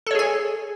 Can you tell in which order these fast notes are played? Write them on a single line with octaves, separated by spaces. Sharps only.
A4 C#5 G#4 G#5